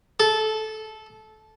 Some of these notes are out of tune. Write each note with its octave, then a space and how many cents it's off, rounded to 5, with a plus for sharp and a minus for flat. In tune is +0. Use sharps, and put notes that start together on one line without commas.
A4 -15